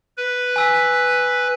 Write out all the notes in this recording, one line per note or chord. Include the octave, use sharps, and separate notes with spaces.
B4
G#5 E6 B6